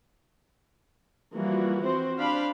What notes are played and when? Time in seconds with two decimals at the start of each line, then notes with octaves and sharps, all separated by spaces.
1.35 E3 F3 G3 A#3 F#4
1.85 C4 F#4 C5
2.18 D4 C5 F5 B5